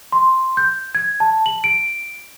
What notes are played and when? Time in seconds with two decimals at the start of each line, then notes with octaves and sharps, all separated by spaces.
0.12 C6
0.57 G6
0.95 G#6
1.20 A5
1.46 F#7
1.64 D7